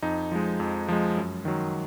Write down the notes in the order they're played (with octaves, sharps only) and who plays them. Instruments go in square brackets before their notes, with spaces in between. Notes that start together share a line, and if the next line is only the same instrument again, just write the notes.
[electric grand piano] F2 D#4
F3 G#3
F2
F3 G#3
F#2
D#3 F#3